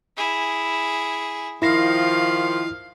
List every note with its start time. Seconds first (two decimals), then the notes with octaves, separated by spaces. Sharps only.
0.17 E4 G#4
1.62 D#3 F3 E4 F5 A#6 C7